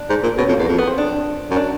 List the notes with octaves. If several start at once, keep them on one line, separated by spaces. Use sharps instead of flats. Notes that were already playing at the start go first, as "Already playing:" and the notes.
Already playing: D4
G#2
A#2
B2 C#4
F2
A#3
E2
F2
B3
C4
D4
F#2
D4